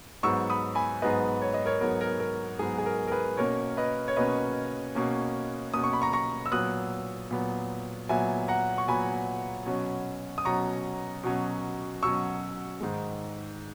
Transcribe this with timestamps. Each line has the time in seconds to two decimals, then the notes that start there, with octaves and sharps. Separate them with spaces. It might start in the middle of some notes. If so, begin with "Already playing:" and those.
0.23 G#2 F#3 B3 C#6 E6
0.50 B5 D#6
0.75 G#5 B5
1.02 G#2 F#3 B3 B4 D#5
1.42 C#5
1.54 D#5
1.65 A#4 C#5
1.81 G#2 F#3 B3 A#4
2.01 A#4
2.20 A#4
2.59 G#2 F#3 B3 G#4
2.78 G#4
2.86 A#4
3.08 A#4
3.12 G#4 B4
3.37 B2 A#3 C#4 A#4 C#5
3.77 B4 D#5
4.08 C#5
4.16 B2 A#3 C#4 B4 D#5
4.95 B2 A#3 C#4
5.74 B2 A#3 C#4 D#6
5.84 C#6
5.93 B5
6.02 A#5 C#6
6.13 A#5 C#6
6.46 E6
6.52 A#2 F#3 B3 D#6 F#6
7.31 A#2 F#3 B3
8.09 A#2 F#3 B3 E5 G#5
8.48 F#5 A#5
8.78 C#6
8.88 A#2 F#3 B3 G#5 B5
9.66 B2 F#3 C#4
10.38 D#6
10.45 B2 F#3 C#4 A#5 C#6
11.23 B2 F#3 C#4
12.03 B2 F#3 C#4 C#6 E6
12.81 G#2 D#3 G#3